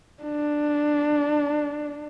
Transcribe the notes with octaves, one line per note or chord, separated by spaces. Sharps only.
D4